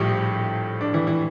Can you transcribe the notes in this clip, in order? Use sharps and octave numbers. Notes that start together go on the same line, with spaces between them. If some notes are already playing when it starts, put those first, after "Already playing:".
Already playing: A#1 A2 F3 G3 G4
D4
E3 E4
E3 E4